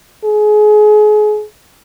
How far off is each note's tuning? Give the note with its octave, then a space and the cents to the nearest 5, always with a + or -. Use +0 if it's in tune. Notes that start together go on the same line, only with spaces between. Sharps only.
G#4 +30